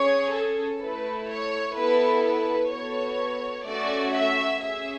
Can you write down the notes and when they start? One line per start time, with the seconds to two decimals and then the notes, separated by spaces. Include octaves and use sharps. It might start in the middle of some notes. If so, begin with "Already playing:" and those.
Already playing: C#4 G#4 C#5
0.34 A4
0.81 A3 E4 A4 B4
1.29 C#5
1.77 B3 E4 A4 B4
2.24 B4
2.72 B3 F#4 A4 C#5
3.67 A3 C#4 F#4 D5
4.14 E5
4.62 C#4 G#4 E5